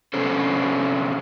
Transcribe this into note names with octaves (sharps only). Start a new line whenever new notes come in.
C3 B3 C#4 D4 A4 C5